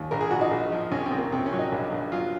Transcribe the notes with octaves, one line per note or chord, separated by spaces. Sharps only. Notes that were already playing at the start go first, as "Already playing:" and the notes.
Already playing: D#2
A#1 A#4
G#4
A#1 F#4
D#4
A#1
F3
C2 C#4
C4
C2
A#3
C3 C4
C#4
F#3
D#4
A#1
A#1
F#3 F4